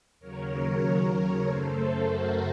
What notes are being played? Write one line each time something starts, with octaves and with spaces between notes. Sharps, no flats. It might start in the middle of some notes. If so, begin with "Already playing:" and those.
D#2 C#3 F#3 A#4 C#5
F#2 C#3 A3 A4 C5
F#4 A#4